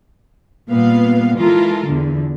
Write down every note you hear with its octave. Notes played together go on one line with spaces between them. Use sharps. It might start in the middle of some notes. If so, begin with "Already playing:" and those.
A#2 G3 B3 F5
E3 G#3 F4 A4 A#4
E2 D3